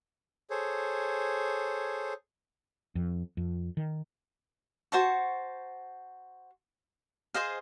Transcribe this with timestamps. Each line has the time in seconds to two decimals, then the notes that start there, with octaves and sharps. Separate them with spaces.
0.50 G#4 A4 C5 C#5
2.95 F2
3.37 F2
3.77 D#3
4.92 F#4 C5 A5 C#6
7.34 G#4 C5 D#5 F5